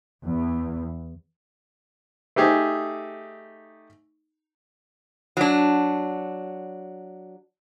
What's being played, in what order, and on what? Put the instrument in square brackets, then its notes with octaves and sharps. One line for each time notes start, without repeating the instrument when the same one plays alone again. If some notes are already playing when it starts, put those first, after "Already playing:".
[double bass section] E2
[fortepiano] A3 D#4 G4 G#4
[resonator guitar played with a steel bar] F#3 D4